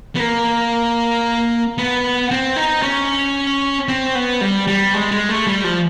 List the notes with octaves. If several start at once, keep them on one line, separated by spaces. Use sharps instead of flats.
B3
A#3
B3
C4
D#4
C#4
C4
B3
G3
G3
G#3
G#3
A3
G3
F3